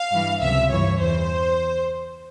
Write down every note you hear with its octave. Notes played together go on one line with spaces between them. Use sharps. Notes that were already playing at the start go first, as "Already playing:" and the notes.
Already playing: F5
G2 E3
C#2 C3 F3 E5
G2 E3 C#5
E2 E3 C5